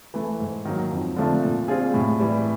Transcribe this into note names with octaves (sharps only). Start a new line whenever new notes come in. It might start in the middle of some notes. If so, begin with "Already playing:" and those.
E3 A3
G#2
D#3 F#3 A#3
F2
D3 F3 A3 C4
A#2
G3 C4 F4 G#4
A2
E3 G3